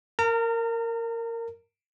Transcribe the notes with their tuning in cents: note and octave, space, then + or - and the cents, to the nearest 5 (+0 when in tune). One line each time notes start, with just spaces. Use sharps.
A#4 -15 A#5 -40